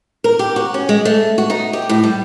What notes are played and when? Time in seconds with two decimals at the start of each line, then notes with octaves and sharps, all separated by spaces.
0.24 A#4
0.39 G4
0.56 F#4
0.74 C#4
0.89 G#3
1.05 A3
1.38 F#4
1.50 D#4
1.73 G4
1.89 A2
2.03 G3